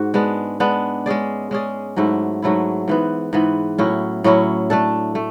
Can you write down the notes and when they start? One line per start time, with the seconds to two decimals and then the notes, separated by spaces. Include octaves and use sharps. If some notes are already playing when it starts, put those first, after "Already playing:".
Already playing: G#2 F#4
0.14 G#3 B3 D4
0.60 G#3 B3 D4
1.06 G#3 C#4 G#4 D5
1.51 G#3 C#4 G#4 D5
1.96 G#2 F#3 A3 E4
2.42 G#2 F#3 A3 E4
2.88 G#2 E3 B3
3.33 G#2 E3 B3
3.78 A2 F#3 C#4 E4
4.24 A2 F#3 C#4 E4
4.70 A3 D4 A4
5.15 A3